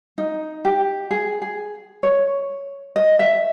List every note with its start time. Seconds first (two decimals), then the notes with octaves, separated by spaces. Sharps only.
0.18 D#4
0.65 G4
1.11 G#4
1.42 G#4
2.03 C#5
2.96 D#5
3.19 E5